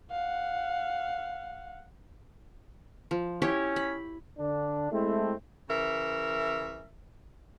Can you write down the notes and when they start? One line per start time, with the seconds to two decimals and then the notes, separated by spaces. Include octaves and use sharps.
0.11 F5 F#5
3.11 F3
3.42 C#4 E4 G4 C#5
3.76 B5
4.39 D3 D4
4.91 G#3 A3 C4 E4
5.69 C#3 E3 A#4 E5